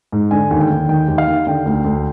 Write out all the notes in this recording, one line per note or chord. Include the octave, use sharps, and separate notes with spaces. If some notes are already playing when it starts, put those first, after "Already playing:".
G#2
D3 G#5
D#2
G5
D#2
D#3 G5
D#2
F5
D#2
D3 G5
D2
D2